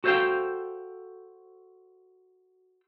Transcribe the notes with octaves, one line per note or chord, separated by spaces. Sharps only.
F#4 A4 C5 D5 F5 G5